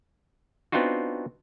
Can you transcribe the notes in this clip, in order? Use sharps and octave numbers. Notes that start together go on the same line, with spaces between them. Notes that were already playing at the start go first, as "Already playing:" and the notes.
B3 C4 D4 D#4 F4 F#4